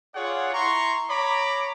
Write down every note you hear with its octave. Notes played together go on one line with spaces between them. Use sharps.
F4 G#4 C#5 D5 F#5
E4 A#5 C6 C#6
C#5 A#5 B5 D6